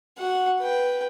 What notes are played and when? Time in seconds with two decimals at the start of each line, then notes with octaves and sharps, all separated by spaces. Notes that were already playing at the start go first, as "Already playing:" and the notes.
0.18 F#4 F#5
0.61 B4 G5